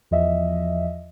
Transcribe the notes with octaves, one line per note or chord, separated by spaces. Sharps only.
E2 F3 D#5 E5